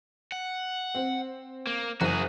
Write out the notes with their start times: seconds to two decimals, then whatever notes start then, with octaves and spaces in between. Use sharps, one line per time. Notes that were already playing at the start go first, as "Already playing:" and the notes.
0.32 F#5
0.95 C4
1.67 A#3
2.01 F#1 F#4 G#4